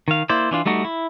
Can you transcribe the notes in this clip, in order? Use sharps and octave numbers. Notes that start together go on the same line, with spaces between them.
D#3 F5
A#3 E4 C5 D5
E3 D4 F4
G3 A3 D#4 F#4
E4